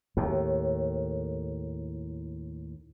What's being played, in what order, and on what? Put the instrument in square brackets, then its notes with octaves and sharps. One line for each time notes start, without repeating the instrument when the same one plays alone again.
[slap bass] D#2 A2